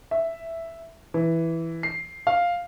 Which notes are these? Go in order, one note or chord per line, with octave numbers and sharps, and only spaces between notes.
E5
E3
C7
F5